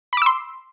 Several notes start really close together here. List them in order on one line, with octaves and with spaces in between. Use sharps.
B5 D6 E6 C6